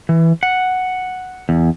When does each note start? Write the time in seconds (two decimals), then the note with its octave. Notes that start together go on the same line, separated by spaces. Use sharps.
0.09 E3
0.43 F#5
1.49 E2